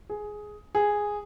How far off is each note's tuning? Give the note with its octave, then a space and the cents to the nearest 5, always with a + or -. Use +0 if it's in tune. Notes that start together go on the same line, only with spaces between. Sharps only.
G#4 +10
G#4 -5